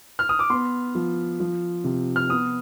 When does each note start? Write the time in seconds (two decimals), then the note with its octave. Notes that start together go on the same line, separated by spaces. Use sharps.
0.19 F6
0.29 D#6
0.39 D6
0.50 B3 C6
0.95 F3
1.40 F3
1.84 C3
2.16 F6
2.29 B3 D#6